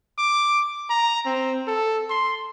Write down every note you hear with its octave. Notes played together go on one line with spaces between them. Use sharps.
D6
A#5
C4
A4
C6